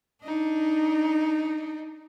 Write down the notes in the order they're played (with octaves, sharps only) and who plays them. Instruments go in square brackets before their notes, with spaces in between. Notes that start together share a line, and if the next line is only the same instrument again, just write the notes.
[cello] D4 D#4